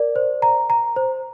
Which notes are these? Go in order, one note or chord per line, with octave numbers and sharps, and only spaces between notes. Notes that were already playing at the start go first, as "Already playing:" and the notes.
Already playing: A#4 D5
C5
A#5
A#5
C5